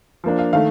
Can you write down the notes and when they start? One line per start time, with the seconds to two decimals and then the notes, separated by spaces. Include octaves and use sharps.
0.24 F3 A#3 D4
0.39 F5
0.53 D#3 A3 F5